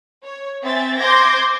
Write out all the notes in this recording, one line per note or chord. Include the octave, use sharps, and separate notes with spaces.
C#5
C4 E5 G#5 A6
C5 C6 D6 G6 G#6 A#6